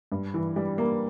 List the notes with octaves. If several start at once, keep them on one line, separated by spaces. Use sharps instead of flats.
G2
E3
G3
A#3